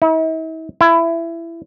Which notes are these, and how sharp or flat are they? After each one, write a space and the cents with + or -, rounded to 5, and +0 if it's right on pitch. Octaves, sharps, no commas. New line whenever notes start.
E4 -45
E4 +20